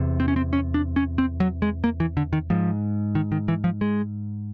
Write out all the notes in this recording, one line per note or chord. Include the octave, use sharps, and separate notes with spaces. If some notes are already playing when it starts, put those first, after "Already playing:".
Already playing: E2 C3
C4
C#4
C4
C#4
D4
C#4
C4
F#3
G#3
A#3
E3
D3
D#3
G#2 F3
D#3
D#3
E3
F3
G#3